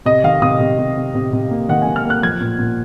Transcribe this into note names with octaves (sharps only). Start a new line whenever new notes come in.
C3 D#5
D#3 F5
C3 D#6
C3
C3
C3
C3
C3
A#3
D#3 F#5
G#5
D#3
F6
A#3
F#6
F3 G#6
A#2
A#2